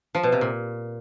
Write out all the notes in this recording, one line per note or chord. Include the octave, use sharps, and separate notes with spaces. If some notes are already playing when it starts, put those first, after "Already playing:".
F3
B2
C3
A#2